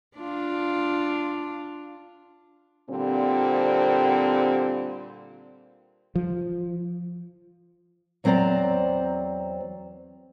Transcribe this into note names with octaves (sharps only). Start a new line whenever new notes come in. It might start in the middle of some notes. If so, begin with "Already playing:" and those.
D4 F4
A#2 D3 G3 C4
F3
E2 F#3 C4 C5 D5 A#5